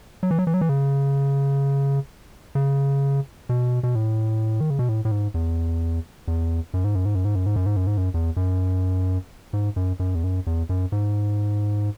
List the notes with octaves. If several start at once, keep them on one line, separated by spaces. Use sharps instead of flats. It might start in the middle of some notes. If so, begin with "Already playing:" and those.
F#3
E3
F#3
E3
F#3
E3
C#3
C#3
B2
B2
A2
D#3
C#3
B2
A2
A2
G#2
E2
E2
F#2
G#2
F#2
G#2
F#2
G#2
F#2
G#2
F#2
G#2
F#2
G#2
F#2
E2
F#2
G#2
F#2
F#2
E2
F#2
E2
F#2
G#2